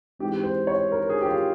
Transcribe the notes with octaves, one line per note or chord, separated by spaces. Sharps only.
G#2 E3 G#3 C4 G4
C5
C#5
A#4
G#4
G4
F4